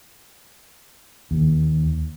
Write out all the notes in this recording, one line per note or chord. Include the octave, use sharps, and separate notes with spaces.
D#2